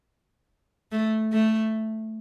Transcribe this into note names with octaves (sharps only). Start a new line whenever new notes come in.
A3
A3